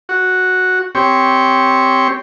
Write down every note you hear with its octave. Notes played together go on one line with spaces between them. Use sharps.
F#4
C4 G4 C#5